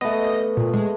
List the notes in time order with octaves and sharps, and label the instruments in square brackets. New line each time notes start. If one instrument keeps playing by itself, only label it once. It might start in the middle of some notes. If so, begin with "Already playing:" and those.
[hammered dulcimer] A3 B3 [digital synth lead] D#5
[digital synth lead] A#2
G#3